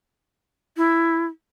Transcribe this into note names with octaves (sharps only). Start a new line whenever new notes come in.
E4